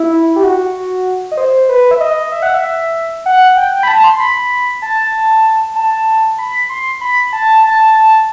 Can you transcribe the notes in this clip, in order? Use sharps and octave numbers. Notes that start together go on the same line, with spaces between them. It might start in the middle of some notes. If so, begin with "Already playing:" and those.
Already playing: E4
G4
F#4
D#5
C5
B4
E5
D#5
E5
F#5
E5
F#5
G5
G5
B5
A5
C6
B5
A5
A5
B5
C6
B5
A5
A5